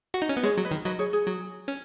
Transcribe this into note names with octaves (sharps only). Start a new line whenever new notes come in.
F#4
D#4
C#4
B3
G#3 G#4 C#5
F#3
B4 D#5
D#3
F#3 B4 D#5
G#4 C#5
G#4
F#3
C#4